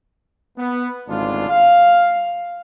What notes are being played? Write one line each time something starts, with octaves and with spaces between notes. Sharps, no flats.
B3
G#1 D2 C#3 D4 F4
F5